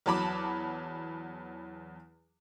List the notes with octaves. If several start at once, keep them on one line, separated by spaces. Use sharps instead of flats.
E2 F#3 A5 B5 D6